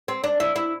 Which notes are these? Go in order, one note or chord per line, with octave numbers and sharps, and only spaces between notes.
C4
D4
E4
E4